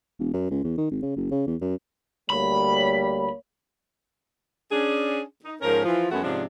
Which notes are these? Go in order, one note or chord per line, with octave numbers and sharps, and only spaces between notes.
E1
F#2
C#2
E2
D#3
G#1
C#3
F#1
C#3
E2
F#2
D2 G3 A#3 C#5 B5
C#4 D4 G#4
D#4
G#2 F3 C#4 A#4
E3 F3 F4
F#2 G#3 A3 B3 C#4 F#4
G#2 C3 F3 C#4 D4